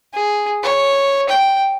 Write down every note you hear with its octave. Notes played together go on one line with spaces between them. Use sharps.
G#4
C#5
G5